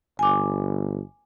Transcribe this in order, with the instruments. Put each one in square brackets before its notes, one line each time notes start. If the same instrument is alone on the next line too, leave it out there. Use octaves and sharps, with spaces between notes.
[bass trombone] G1 [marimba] G#5 D6